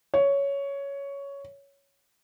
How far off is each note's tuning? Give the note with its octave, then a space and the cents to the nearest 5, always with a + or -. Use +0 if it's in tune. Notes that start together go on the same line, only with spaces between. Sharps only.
C#5 +10